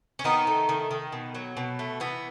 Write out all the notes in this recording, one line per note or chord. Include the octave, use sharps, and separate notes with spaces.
C#4
D#3 B3 D#4
A3
D#3
D#3
B2
F#3
B2
A3
E3 B3